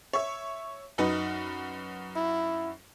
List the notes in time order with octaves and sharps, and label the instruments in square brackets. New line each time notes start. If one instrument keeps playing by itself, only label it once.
[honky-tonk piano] C#5 E5
F#2 D#4 B4
[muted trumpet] E4